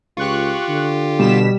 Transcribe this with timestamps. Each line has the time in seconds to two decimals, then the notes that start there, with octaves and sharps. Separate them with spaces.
0.17 C#2 F4 G4 C#6 F#6
0.68 D3
1.19 B2 G3 B6 E7